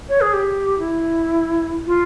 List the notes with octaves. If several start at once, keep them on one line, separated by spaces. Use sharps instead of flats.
C#5
G#4
G4
E4
F4